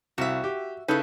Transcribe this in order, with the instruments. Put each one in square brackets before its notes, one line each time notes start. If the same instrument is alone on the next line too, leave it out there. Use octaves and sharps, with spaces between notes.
[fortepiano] C2 F5 [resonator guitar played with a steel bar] F#4 E5
[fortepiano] G4
[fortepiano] C#3 A4 B4 [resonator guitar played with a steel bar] D#4 E4